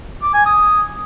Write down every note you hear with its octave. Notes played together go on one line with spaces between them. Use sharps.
D6
G#5
D#6